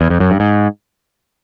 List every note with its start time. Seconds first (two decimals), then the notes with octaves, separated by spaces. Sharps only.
0.01 E2
0.10 F2
0.20 F#2
0.31 G2
0.40 G#2